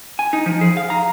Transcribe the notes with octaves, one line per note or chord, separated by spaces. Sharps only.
G#5
D#4
F3
G#4
F5
A#5